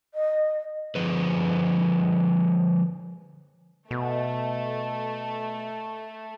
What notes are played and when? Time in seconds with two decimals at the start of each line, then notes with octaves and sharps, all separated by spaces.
0.14 D#5
0.95 D3 F3 G#4 B4
3.91 B2 A3